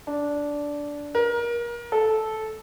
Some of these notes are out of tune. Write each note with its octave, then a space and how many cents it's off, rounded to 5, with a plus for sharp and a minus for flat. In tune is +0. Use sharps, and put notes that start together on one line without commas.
D4 -10
A#4 +25
A4 -10